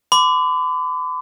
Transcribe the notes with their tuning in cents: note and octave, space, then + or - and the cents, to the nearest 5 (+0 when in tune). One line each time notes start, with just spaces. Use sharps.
B5 +45 D6 -5